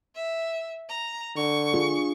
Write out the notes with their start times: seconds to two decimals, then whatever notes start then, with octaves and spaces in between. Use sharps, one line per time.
0.15 E5
0.89 A#5
1.36 D3 C#6
1.74 D4 F4 G#4